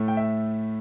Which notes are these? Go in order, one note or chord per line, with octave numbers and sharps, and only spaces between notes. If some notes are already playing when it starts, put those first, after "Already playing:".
Already playing: A2 A3
G5
E5